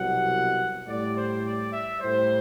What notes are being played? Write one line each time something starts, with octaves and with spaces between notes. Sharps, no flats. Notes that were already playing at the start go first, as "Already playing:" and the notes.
Already playing: C2 B2 F#3 F#5
A2 G3 D5
C5
D5
E5
A2 G3 C5